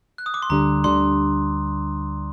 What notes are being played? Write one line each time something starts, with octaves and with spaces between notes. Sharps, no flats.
F#6
D#6
D6
C6
D2 D3 G3 D4 A#5
D2 D3 G3 D4 C6